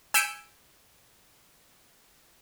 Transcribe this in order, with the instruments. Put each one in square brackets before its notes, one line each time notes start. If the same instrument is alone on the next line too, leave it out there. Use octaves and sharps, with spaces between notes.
[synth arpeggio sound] G#5 E6 G6 B6 C#7 D7